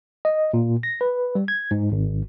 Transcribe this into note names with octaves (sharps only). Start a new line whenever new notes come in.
D#5
A#2
A#6
B4
G3
G#6
G#2
G#1